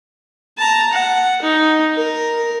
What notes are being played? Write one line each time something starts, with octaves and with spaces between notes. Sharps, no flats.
A5 A#5
F#5
D#4
A#4